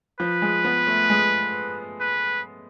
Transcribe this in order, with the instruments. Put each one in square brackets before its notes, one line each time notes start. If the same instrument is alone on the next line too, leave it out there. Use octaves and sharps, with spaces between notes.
[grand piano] F3 [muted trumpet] B4
[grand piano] G#3
B3
A3
G#3
[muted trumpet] B4